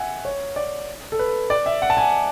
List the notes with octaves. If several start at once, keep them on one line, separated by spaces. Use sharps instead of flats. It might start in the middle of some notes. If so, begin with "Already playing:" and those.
Already playing: E5 F#5 G#5
C#5
D5
A4
B4
D5
E5
F#5
A5
G#5